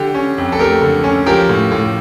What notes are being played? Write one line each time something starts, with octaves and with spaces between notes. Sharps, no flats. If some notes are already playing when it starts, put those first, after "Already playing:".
Already playing: D3 G4
C#4
F2
A4
A3 G4 A#4
D3
C#4
F3 G4 A#4
A2
A2